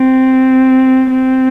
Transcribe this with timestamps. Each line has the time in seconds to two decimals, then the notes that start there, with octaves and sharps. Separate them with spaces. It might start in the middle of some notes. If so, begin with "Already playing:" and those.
Already playing: C4
1.10 C4